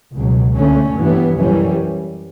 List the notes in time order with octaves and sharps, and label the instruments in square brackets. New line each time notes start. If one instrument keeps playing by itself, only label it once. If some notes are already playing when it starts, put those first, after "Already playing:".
[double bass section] C#2 B2 F#3
D2 D3 A3 C#4
G2 E3 B3
F#2 E3 G3 C#4